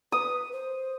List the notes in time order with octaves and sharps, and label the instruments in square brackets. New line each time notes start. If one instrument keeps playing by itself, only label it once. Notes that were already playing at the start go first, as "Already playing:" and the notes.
[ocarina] B4 [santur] D#6
[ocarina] C5